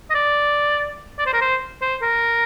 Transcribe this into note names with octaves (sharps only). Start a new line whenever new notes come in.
D#5
D5
D5
C5
A#4
C5
C5
A#4